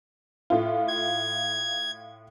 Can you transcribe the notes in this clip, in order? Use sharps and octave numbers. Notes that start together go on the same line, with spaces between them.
A2 F4
G#6